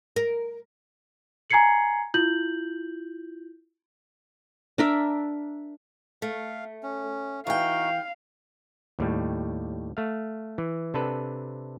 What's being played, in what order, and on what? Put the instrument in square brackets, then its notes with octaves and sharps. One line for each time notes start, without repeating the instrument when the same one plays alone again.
[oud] A#4
[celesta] G#5 A#5 G#6 C7 C#7 F#7
E4 F4 G6 F#7
[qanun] D4 A#4 E5
[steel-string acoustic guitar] A3 [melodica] F5
[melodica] C#4
[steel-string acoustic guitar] E3 G5 [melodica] D#4 F#4 [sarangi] F5
[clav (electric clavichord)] D#2 A2 G3
A3 F5
E3
C3 D4 A4 B4